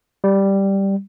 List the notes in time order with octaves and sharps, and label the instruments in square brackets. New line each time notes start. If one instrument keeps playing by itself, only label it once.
[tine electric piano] G3